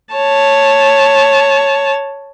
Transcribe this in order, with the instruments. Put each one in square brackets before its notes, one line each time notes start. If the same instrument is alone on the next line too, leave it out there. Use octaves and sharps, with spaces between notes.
[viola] C#5 A5